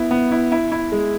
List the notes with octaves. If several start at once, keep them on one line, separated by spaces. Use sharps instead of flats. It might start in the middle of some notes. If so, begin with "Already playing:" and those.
Already playing: B3 E4
B3
E4
E4
E4
G#3